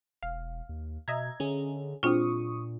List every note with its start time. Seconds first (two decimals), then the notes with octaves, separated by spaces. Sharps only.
0.23 E1 F5
0.69 D#2
1.08 B2 D#5 E5 A#5 G#6
1.40 D3 C#4 G#4
2.03 A#2 F#3 G#3 C4 D4 F4 C#6 D#6